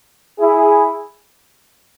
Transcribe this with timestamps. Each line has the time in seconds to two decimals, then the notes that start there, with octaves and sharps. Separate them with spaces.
0.39 E4 G#4